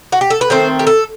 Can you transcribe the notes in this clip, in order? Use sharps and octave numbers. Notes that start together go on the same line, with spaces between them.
F#4
G4
A4
B4
D#3 A3 C4 C5
G4
A4